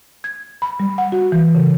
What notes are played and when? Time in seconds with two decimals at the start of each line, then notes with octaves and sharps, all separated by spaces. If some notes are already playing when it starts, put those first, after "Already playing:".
0.24 G#6
0.62 B5
0.80 G3
0.98 F#5
1.12 F#4
1.32 E3
1.55 C#3